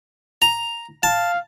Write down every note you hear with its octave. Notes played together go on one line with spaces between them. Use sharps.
A#5
F5 A5